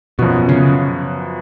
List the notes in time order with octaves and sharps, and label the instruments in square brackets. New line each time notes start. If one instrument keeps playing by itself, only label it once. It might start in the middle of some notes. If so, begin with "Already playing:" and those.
[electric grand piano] F#2 F3 B3 F#4 [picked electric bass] B2
[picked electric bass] C#3